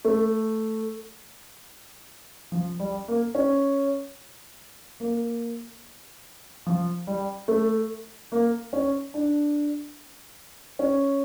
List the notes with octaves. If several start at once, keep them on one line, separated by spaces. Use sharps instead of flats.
A3
F3
G3
A#3
C#4
A#3
F3
G3
A3
A#3
C#4
D4
C#4